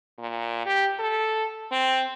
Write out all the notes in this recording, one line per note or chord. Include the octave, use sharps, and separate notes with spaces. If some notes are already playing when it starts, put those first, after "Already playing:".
A#2
G4
A4
C4